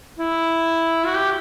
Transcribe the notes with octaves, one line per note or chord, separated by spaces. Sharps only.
E4
F#4
G4